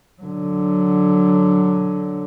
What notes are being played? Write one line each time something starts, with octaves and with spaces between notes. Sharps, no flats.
D3 F#3